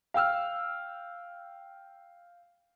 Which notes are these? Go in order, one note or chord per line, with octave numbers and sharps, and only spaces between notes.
F5 G5 E6 F6